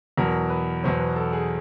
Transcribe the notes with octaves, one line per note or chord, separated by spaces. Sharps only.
E2 B2 F#3 A#4
B4
E2 B2 F#3 C5
B4
A4
G#4